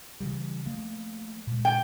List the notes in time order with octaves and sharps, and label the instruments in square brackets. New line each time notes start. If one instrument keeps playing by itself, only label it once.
[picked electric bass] C#3 E3 G3
F3 A3 A#3
A#2 G#3
[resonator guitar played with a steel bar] G5